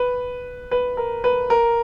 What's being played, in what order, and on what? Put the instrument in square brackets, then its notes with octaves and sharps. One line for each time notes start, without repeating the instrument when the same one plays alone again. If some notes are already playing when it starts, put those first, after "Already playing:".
Already playing: [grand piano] B4
B4
A#4
B4
A#4